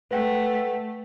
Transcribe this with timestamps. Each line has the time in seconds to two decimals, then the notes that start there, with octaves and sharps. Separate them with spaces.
0.11 A3 B4 F#5 G5